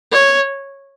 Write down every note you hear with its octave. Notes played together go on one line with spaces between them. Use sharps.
C#5